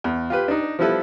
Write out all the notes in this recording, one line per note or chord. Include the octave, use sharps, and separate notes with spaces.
E2
F4 G4 B4
D4 D#4
F3 G3 B3 E4 A4 B4